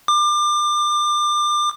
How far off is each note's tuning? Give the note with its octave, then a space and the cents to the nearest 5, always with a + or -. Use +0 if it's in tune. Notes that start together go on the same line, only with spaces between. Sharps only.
D6 +30